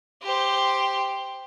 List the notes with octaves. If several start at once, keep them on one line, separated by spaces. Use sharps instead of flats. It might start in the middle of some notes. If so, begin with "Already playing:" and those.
G4 C5